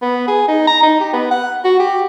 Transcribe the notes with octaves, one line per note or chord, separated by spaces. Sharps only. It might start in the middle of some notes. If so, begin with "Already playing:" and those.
B3
G#4
D#4
A#5
D#4
G4
B3
F#5
F#4
G4